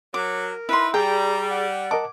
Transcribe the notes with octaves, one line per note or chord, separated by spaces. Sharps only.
F#3 A#4 D6
D#4 E4 B4 C6
G3 G#4 G5 A#5
F#5
A#4 D#5 A5 D6